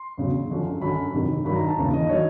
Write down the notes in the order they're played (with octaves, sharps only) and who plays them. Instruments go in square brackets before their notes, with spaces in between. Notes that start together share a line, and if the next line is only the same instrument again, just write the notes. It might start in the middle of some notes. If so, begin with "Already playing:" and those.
Already playing: [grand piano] C6
E2 C#3 F#3
F#2 D3 F3
F#2 D3 F#3 B5
F2 C3 D#3 F#3
G2 D#3 F#3 B5
A#5
A5
D#2 C#3 E3
D#5
D#3 F#3 C#5